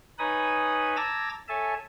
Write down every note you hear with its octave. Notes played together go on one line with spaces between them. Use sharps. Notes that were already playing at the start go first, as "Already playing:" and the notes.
D#4 B4 C#5 G#5 B5 D#6
A5 A#5 D6 E6 G#6 A#6
A4 C#5 E5 G#5 A5